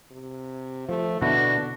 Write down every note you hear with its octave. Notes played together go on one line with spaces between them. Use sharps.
C3
F3 A3
B2 D3 D4 E4 F#4